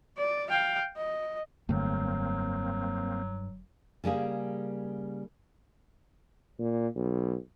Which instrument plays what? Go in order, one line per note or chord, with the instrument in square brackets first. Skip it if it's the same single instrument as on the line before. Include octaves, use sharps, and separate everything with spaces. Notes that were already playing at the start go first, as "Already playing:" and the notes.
[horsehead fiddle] D5
F5 G5
D#5
[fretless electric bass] F1 D3 A3 [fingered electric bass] G2 [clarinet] F#3 [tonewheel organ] A#3 C4
[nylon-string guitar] C#3 G3 A#3 G#4
[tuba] A#2
B1